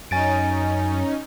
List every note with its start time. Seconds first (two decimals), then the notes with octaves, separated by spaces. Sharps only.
0.11 F#2 C#4 D#4 G#5 A6 D7